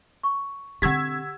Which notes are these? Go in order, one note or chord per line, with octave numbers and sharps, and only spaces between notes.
C#6
D3 C4 G4 F#5 E6 G#6 B6